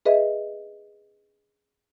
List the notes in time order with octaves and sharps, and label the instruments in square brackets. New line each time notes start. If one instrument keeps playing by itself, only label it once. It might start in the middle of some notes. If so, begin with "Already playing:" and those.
[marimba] G#4 B4 D#5 E5